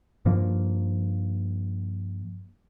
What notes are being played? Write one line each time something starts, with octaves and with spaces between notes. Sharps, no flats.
G2 F3 A#3